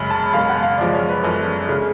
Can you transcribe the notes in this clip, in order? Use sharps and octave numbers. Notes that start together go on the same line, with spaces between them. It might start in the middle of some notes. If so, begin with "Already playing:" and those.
Already playing: F#2 C#3 G#3 B5
A5
F#2 C#3 G#3 F5
F#5
F5
F#2 F3 G#3 D5
C#5
B4
F#2 F3 G#3 A4
C#3 G#3